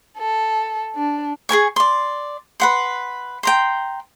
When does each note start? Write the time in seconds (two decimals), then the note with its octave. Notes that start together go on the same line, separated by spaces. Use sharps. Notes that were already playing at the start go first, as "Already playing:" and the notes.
0.18 A4
0.95 D4
1.49 G#4 A#4 G#5 C#6
1.76 D5 C6
2.60 B4 F#5 C6
3.43 G5 A#5 C6